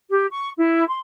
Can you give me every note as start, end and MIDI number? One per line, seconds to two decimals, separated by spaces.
0.11 0.27 67
0.31 0.50 85
0.57 0.86 64
0.87 0.99 84